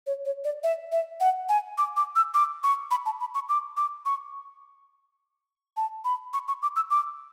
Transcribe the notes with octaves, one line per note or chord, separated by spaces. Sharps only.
C#5
C#5
D5
E5
E5
F#5
G#5
D6
D6
E6
D6
C#6
B5
A5
B5
C#6
D6
D6
C#6
A5
B5
C#6
C#6
D6
E6
D6